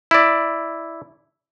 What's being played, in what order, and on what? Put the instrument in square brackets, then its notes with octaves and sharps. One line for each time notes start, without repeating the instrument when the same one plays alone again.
[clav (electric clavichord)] E4 D5